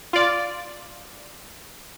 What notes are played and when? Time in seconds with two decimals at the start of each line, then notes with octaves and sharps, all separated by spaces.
0.13 F4 D5